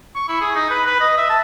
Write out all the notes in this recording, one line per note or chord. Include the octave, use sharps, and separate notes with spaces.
C#6
E4
G#4
D#4
B4
B4
D#5
E5
A5